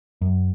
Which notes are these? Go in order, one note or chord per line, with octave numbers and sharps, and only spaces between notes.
F#2